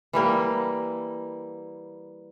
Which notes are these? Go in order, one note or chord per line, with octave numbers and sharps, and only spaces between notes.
E3 G3 A#3